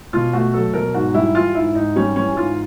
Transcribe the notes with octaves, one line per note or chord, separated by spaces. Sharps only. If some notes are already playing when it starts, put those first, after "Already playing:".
B2 F4
A3 F#4
F#3 A4
B2 A#4
G#2 F#4
G3 E4
E3 F4
G#2 E4
G#2 D#4
G3 C#4
E3 C#4
G#2 F4